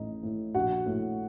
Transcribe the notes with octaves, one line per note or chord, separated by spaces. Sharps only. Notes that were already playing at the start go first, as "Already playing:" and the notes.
Already playing: A1 A2 D#4
A2
A#1 F#4 F#5
A2